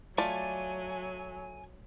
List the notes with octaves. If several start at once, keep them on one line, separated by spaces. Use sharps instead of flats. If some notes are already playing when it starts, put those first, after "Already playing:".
F#3 A3 F4 D5 G#5